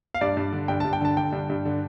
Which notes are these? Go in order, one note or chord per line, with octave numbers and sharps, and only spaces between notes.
F5
G2 D5
G2
D3
G2 G5
A5
G2
G5
D3 A5
D3 G5
G2
G2
D3